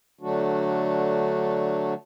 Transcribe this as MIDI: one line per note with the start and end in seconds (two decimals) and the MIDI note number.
0.21 1.94 50
0.21 1.94 54
0.21 1.94 57
0.21 1.94 62
0.21 1.94 66